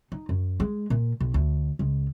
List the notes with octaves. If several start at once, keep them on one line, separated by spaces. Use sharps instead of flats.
D#4
F#2
G#3
A#2
B1
D2
C#2